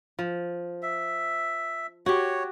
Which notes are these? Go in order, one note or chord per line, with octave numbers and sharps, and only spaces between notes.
F3
E5
F#4 G4 C#5